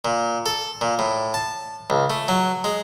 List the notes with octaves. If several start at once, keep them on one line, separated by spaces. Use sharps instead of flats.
A#2
A4
A#2
A2
A5
C#2
A3
F#3
G#3